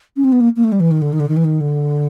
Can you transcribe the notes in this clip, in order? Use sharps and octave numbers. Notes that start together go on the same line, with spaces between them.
C#4
C4
B3
A#3
A#3
A3
G3
E3
D#3
D3
D#3
D3
D#3
E3
D#3
D3